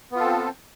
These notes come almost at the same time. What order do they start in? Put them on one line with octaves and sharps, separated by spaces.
B3 F4 A4 C4